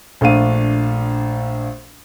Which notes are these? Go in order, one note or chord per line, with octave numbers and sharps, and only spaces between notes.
A#1 A3 D4 F5 D#7